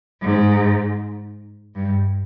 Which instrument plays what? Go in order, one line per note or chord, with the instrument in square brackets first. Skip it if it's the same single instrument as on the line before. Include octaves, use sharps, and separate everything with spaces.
[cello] G#2
G2